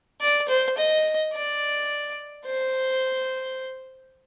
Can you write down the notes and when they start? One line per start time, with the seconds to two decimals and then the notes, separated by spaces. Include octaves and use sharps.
0.21 D5
0.49 C5
0.77 D#5
1.33 D5
2.46 C5